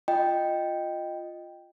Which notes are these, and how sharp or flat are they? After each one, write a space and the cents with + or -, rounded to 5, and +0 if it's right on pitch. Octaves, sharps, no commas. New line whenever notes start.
F4 +0 D#5 -5 G5 +0